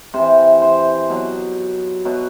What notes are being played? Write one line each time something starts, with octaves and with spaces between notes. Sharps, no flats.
C3 E3 C5
C5
B2 F#3
B2 F#3